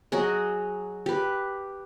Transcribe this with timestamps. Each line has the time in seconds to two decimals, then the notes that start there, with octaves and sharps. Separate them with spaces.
0.12 F#3 F#4 G#4 D#5
1.06 G4 B4